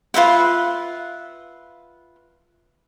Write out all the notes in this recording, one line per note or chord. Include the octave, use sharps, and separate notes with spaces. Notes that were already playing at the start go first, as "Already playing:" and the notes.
F4 B4 E5 F#5